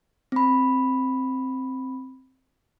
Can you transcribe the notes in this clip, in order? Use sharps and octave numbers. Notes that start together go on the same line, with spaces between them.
C4 B5